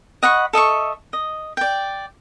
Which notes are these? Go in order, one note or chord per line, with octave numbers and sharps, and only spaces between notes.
D#5 F#5 B5 C#6
A4 D#5 E5 C#6
D#5
D5 G5